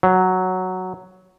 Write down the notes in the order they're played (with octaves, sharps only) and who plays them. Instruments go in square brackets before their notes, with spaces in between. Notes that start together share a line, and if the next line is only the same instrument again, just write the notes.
[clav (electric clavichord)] F#3